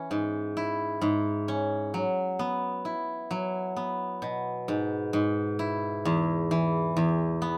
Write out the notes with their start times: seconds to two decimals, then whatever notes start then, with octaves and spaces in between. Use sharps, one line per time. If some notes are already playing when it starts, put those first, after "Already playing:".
Already playing: E3 C#4
0.11 G#2
0.57 E4
1.01 G#2
1.48 C#4
1.94 F#3
2.39 B3
2.85 E4
3.31 F#3
3.76 B3
4.22 B2
4.68 G#2
5.13 G#2
5.59 E4
6.05 E2
6.51 E3
6.97 E2
7.42 B3